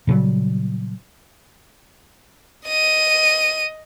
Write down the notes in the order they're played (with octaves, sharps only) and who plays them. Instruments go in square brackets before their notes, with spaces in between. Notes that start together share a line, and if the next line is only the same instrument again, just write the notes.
[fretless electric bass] A#2 C#3 F#3 G3
[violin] D#5 D#7